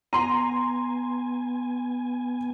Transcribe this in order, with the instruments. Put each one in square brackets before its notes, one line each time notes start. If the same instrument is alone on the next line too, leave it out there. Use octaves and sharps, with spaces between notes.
[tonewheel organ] B3 G#5 [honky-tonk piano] A#5 C6